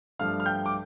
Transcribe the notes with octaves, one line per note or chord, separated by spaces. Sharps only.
G2 F3 A3 D4 F5 F6
F6
G5 G6
D6